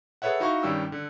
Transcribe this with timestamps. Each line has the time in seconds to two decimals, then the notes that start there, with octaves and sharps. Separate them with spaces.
0.22 G#4 A4 B4 C#5 E5 F#5
0.40 D#4 E4 F#4 F5 C#6
0.63 G2 D#3 G3 C#4 G4 E6
0.92 D3